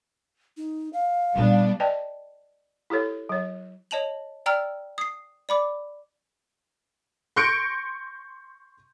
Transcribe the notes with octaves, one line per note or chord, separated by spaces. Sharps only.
D#4
F5
A#2 G3 B3 C#4 D4
B4 D5 D#5 G5 A5
E4 G4 A4 C#5
F#3 C#5
C#5 D#5 A5 F7 F#7
D5 G5 A#5 E6 F6
D#6 C7
D5 B5 D6
C6 C#6 G6 A#6 C#7 D7